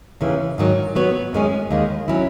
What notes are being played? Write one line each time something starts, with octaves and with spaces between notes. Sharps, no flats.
D#2 C#3 E3
G#2 D#3 F#3
F#3 B3 F#4 C#5
F#2 D#3 G#3 C#4
D#2 D#3 G#3
F#3 C#4 E4